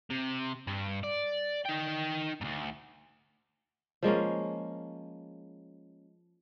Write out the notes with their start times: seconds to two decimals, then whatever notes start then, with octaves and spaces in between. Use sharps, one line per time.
0.10 C3
0.67 G2
1.04 D5
1.66 D#4 G5
2.41 D2 G#2
4.02 F3 G#3 A#3 C#4